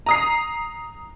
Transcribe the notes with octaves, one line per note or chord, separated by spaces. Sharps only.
A#5 D#6 C7